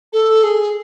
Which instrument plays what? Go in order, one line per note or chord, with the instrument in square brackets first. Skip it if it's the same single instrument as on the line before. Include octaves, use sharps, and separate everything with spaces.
[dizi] A4
G#4